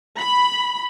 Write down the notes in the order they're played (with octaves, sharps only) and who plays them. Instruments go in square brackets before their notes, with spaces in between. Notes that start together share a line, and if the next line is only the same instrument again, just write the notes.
[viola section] B5